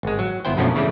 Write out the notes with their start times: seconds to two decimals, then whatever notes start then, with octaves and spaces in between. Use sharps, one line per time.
0.03 G#1 G#3
0.19 F#3
0.45 G1 B3 E4 C5 G5
0.57 F#2 B2 F3 A3 C#4 D4
0.75 C#3 E3 G3 A3